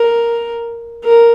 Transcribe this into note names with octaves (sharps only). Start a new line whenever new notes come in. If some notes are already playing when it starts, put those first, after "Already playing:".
Already playing: A#4
A#4